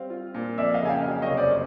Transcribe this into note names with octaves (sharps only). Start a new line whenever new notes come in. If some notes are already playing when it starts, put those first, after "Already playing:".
Already playing: G3 C4 F5
F4
A#2
F2 D5 E5
D#5 F5
C#3 G#5
F5 G5
F#3
C#5 D#5
F1
C5 D5